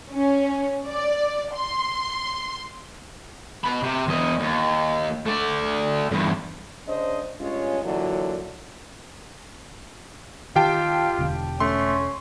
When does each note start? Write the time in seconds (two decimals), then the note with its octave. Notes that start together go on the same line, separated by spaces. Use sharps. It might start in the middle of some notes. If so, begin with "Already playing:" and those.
0.12 C#4
0.87 D5
1.54 C6
3.64 B2 B5
3.83 C3
4.08 E2 D#5
4.40 D#2
5.26 A3 D5
6.11 E2 G2
6.87 C#3 D4 C5 D#5
7.40 G2 G#3 C#4 F4 C#5
7.83 A#2 D3 E3 F#3
10.56 D#3 F4 G4 G5 A5
11.19 E1 D3
11.60 A3 C#4 C6